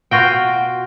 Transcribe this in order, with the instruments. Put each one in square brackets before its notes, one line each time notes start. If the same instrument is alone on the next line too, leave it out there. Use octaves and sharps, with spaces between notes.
[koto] B2 F4 F#4 G5